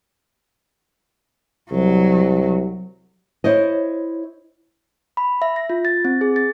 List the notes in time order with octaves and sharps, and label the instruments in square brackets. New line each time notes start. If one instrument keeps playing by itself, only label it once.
[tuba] C2 [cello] F#3
[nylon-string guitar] E4 C5 C#5 D#5
[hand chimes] B5
E5
A#6
F4
A6
C4
G#4
A6